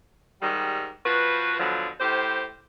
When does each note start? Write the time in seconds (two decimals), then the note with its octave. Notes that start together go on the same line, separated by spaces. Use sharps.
0.42 G#2 D#3 G3
1.06 F3 F#4 B4
1.59 B2 D3 F3 F#3
2.00 A2 G4 C5